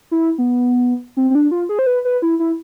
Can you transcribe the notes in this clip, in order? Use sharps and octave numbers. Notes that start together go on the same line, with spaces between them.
E4
B3
C4
C4
D4
F4
G#4
C5
B4
B4
E4
E4